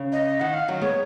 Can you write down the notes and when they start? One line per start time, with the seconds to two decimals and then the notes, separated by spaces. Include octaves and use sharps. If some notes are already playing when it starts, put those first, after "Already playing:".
Already playing: C#3
0.12 D#5
0.40 D#3 F#5
0.54 F5
0.68 D#3 F#3
0.81 G#3 B3 C#5